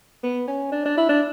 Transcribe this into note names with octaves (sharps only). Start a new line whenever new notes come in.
B3
C#4
D4
D4
E4
D4